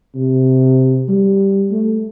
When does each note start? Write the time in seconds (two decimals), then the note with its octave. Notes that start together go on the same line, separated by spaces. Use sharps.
0.15 C3
1.09 G3
1.71 A3